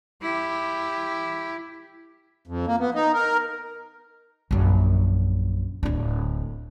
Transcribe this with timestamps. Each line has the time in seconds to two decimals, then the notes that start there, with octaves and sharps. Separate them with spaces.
0.22 E4 G4
2.47 F2
2.67 A#3
2.79 B3
2.94 D#4
3.14 A#4
4.51 A#1 F#2
5.83 D1 D4